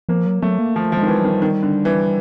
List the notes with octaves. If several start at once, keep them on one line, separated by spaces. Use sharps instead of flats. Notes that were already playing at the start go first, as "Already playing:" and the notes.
F3 A#3
F#3
F#3 A3
A#3
F3 A3
F3
G#3
D#3
E3
G3
D#3
D#3
D3
E3